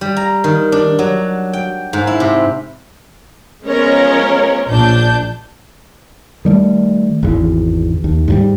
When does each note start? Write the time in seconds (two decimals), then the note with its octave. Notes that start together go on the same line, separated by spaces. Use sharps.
0.01 G3
0.17 A#5
0.44 D#3
0.72 D4
0.99 F#3
1.53 G5
1.93 G#2
2.07 E4
2.20 C3
3.67 F3 G#3 B3 C#4 A#4 C#5
4.67 A#1 D4 G6
6.45 D#3 G3 A3
7.23 G#1 E2
8.04 D#2
8.28 G#2 F3 G3